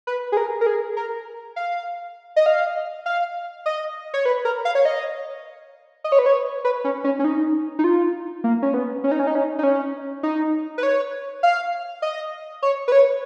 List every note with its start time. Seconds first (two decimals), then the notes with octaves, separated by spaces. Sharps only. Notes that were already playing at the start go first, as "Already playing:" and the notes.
0.07 B4
0.32 G#4
0.37 A#4
0.61 A#4
0.67 G#4
0.97 A#4
1.56 F5
2.36 D#5
2.46 F5
3.06 F5
3.66 D#5
4.14 C#5
4.26 B4
4.45 A#4
4.65 F5
4.75 C#5
4.85 D#5
6.04 D#5
6.12 C#5
6.19 B4
6.26 C#5
6.65 B4
6.84 C#4
7.04 C#4
7.19 C#4
7.24 D#4
7.79 D#4
7.84 F4
8.44 A#3
8.62 C#4
8.74 B3
9.04 C#4
9.12 D#4
9.19 C#4
9.27 D#4
9.35 C#4
9.59 D#4
9.63 C#4
10.23 D#4
10.78 B4
10.83 C#5
11.43 F5
12.02 D#5
12.62 C#5
12.88 B4
12.92 C#5